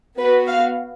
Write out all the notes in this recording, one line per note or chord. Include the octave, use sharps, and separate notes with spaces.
B3 F#4 B4
F5